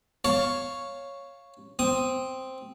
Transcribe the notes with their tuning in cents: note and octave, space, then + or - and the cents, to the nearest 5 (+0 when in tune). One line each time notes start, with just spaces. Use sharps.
C#5 +0 F5 +0 A5 +10
C4 +0 D#6 +0